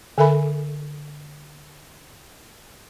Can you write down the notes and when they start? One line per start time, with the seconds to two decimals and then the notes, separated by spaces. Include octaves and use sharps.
0.18 D3 A4 A#4 E5 G#5 B5